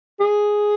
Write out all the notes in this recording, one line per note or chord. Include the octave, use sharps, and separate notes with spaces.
G#4